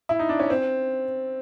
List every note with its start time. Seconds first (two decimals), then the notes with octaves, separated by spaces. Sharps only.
0.09 E4
0.19 D#4
0.29 D4
0.40 C#4
0.50 C4